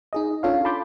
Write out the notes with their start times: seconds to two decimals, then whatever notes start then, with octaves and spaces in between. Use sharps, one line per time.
0.13 D#4 G#4 D#5
0.43 C#4 D4 F4 A4 C#5 F5
0.65 A5 B5 C6 D6 G6